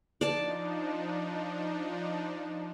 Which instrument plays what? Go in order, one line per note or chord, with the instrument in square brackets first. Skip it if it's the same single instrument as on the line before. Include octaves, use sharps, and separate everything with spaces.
[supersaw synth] F3 D4 D#4 [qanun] D5 A5